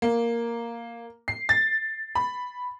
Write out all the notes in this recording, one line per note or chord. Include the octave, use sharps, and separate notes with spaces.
A#3
C7
A6
B5